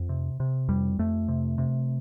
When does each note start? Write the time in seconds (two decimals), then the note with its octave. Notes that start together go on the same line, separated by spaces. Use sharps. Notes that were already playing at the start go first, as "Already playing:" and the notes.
Already playing: F2
0.09 C3
0.40 C3
0.68 F2 G3
0.99 F2 A3
1.28 C3
1.58 C3